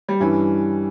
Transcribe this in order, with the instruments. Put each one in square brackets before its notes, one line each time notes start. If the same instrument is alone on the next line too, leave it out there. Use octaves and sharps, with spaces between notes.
[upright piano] G3
[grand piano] G2 G3 C#4 E4 [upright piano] E3